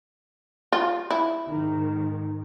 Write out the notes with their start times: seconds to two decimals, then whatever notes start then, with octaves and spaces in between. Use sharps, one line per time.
0.73 F4
1.11 E4
1.49 G#2 D#3